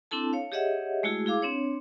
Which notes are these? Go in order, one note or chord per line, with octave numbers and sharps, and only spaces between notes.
C4 D4 E4 A4 A5
C#5 F5
G4 G#4 C#5 D#5 E5 F#5
G#3 A3 E4 F#4 G#4
E4 G#4 F5 D6
C4 D4 C#5